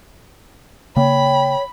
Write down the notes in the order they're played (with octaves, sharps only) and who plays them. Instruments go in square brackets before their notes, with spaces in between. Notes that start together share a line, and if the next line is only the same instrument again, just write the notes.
[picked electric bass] C#3 A#3 [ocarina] C#5 [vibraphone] G5 [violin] B5